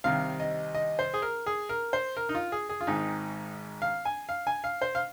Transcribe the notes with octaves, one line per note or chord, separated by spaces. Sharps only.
C2 C3 D#3 F5
D#5
D#5
C5
G#4
A#4
G#4
A#4
C5
A#4
D#4
F4
G#4
G#4
F4
G#1 G#2 D#3 D#4
F5
G#5
F5
G#5
F5
C5
F5